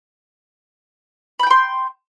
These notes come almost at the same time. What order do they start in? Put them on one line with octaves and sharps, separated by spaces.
B5 G6 G5 C6